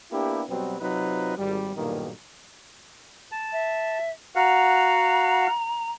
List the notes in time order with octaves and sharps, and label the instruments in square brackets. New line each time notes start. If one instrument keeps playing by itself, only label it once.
[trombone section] A#3 B3 D4 E4 G4
B2 F#3 G3 B3 C4
C3 F#3 C4 D#4 F4 B4
G#1 G3
B1 G2 A#2 D#3 A#3 D#4
[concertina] A5
[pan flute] E5
[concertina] F#4 F5 F#5 [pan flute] A#5